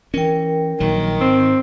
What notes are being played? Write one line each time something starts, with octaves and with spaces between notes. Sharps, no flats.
E3 C#4 A#4 G5
A#1 D#3 F#3
G#2 C4